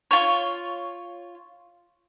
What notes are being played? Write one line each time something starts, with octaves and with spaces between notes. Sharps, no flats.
F4 C#5